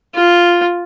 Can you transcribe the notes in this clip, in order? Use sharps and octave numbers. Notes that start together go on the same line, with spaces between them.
F4